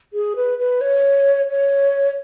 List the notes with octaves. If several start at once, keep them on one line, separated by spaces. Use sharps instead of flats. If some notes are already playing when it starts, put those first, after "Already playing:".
G#4
B4
B4
C#5
C#5